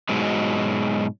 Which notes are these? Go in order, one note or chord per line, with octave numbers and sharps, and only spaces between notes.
G#2 B2 F#3 G#3